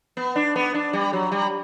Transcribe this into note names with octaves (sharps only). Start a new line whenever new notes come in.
B3
D4
B3
D4
G3
F#3
G3